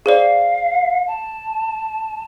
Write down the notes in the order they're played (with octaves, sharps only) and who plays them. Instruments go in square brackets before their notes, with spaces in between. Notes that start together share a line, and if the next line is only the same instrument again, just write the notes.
[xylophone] G#4 C5 D5 [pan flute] F5
[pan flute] A5